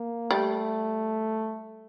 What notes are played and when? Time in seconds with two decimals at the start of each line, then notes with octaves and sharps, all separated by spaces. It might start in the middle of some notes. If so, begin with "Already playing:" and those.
Already playing: A#3
0.31 G3 A3